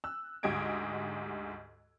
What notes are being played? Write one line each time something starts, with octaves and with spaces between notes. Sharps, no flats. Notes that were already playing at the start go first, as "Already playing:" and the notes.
E6 F#6
D2 G#2 G4 D#5 G#6 D7